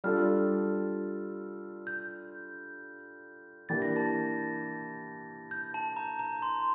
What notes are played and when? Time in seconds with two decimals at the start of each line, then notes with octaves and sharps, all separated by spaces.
0.04 G3 D4 F4 A4 F6
1.87 G6
3.69 E3 A#3 D4 G4 A6
3.82 A#6
3.96 A5 A6
5.51 G6
5.74 A5
5.97 A#5
6.19 A#5
6.42 C6